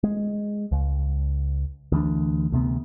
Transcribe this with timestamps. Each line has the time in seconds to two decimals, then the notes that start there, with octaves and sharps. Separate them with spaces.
0.03 G#3
0.72 C#2
1.92 D2 E3 D4
2.52 D2 C3 B3